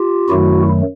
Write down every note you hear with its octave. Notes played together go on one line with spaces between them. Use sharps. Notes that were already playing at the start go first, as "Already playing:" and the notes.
Already playing: F4 G4
F#2 D#3 F#3 A3 E4 F#4